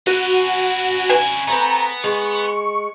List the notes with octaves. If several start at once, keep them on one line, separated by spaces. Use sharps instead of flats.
C#4 E4 F#4
G#5
A3 B3 C4 B4 A#5
G#3 C#6